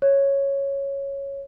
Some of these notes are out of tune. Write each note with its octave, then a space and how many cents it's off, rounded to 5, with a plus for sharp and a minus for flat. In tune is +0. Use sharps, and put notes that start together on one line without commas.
C#5 -5